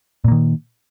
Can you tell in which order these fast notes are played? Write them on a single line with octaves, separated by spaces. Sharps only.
A#2 A#3 D#3